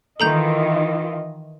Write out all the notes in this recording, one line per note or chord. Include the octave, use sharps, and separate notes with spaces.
D#3 E3 F4 A4 D#5 A#5 G6